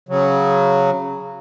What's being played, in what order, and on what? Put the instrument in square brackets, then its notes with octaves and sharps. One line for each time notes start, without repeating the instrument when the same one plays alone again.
[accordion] C#3 F#3